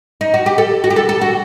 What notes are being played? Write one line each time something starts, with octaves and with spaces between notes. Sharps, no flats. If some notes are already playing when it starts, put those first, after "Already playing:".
D#4
F#4
G4
A4
F#4
G4
A4
A4
F#4